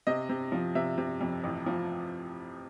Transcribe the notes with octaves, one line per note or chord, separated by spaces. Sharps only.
C3 D#5
C3
F3
C3 E5
C3
F2
A1
F3